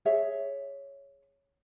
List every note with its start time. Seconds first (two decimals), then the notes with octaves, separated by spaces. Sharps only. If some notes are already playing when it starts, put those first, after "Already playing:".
0.05 G#4 C#5 E5